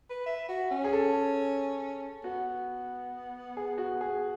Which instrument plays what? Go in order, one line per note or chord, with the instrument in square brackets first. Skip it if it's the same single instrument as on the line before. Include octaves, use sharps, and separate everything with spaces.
[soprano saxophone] B4
E5
F#4
C#4
[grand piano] G#4
A4
[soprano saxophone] B3 [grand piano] F#4
[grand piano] G#4
F#4
G#4